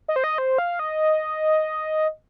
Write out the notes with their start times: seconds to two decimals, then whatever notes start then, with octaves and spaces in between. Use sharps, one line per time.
0.08 D#5
0.16 C5
0.24 D#5
0.38 C5
0.58 F5
0.79 D#5